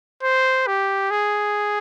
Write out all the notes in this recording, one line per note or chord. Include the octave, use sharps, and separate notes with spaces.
C5
G4
G#4